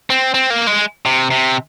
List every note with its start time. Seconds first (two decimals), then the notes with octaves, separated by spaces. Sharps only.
0.10 C4
0.34 C4
0.50 A#3
0.67 G#3
1.06 C3
1.31 C3